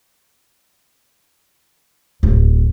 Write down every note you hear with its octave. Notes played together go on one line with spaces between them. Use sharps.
D1